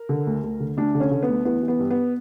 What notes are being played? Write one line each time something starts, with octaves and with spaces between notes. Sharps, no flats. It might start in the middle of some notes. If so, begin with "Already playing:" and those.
Already playing: A#4
D3
D2
D2
D3
D2 D4
D3
C#4
D3
B3
D2
E3 B3
E3
B3
G2
B3